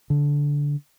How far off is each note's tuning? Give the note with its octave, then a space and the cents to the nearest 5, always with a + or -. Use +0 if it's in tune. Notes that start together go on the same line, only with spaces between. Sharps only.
D3 -20